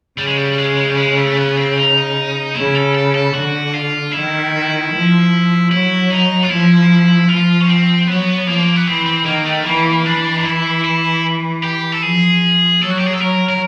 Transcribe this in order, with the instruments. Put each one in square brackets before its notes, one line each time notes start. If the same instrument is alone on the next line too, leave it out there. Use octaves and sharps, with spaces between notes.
[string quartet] C#3 [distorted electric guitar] G3
[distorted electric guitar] G#3
G3
G#3
G3
G#3
A3
B3
C4
D#4
[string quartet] C#3 [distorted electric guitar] E4
[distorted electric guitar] A4
A4
A4
[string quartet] D3 [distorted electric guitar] F#4
[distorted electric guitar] F4
[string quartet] D#3 [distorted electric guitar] E4
[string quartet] F3
[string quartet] F#3 [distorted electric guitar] E4
[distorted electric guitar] D#4
F4
[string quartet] F3 [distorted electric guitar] E4
[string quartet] F3 [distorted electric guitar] F4
[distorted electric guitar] C#4
C4
[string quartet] F#3 [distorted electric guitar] B3
[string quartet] F3 [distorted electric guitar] A#3
[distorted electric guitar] B3
[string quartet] E3 [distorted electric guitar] C4
[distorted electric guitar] C4
[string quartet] D#3 [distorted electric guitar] A#3
[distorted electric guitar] A3
[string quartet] E3 [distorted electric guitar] A#3
[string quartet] E3 [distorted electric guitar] D4
[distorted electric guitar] D#4
E4
E4
G4
A4
[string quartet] F3 [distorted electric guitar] G#4
[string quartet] F#3 [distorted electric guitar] A4
[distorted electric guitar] F#4
G4
G#4
A4
[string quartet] F#3 [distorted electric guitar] A#4
[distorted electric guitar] A#4